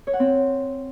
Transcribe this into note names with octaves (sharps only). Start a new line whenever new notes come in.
C#5
F#5
C4